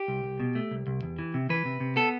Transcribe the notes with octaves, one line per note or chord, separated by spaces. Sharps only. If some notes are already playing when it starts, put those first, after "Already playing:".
Already playing: G4
C2
C2
B2
A3
C2
C2
E2
E3
C3
E3 B4
C3
C3
B3 A4